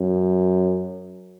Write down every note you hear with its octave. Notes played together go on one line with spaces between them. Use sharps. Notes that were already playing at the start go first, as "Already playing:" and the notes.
Already playing: F#2